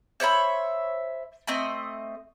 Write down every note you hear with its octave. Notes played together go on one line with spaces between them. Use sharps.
C5 C#5 E5 B5
A3 C4 D#5